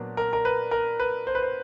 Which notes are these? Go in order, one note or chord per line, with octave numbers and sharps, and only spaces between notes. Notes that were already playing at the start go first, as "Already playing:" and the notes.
Already playing: A#2 F#3 B3 D4
A#4
A#4
B4
A#4
B4
C5
B4
C5